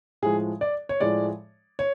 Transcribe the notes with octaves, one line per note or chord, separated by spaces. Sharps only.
A2 F3 G#3 G#4
D5
C#5
A2 F3 G#3 D5
C#5